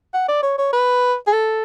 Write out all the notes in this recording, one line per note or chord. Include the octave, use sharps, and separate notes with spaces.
F#5
D5
C#5
C#5
B4
G#4
A4